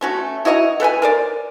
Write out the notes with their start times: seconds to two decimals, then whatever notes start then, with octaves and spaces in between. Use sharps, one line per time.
0.01 A3 C#4 F#4
0.45 E4 F#4 D#5 A#5
0.80 A4 B4 G5 G#5
1.02 A#4 C5 D5